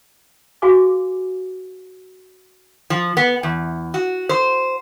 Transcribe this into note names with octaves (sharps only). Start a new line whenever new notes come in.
F#4 G#4 F5 G#5 D6
F3
B3
E2
F#4
C5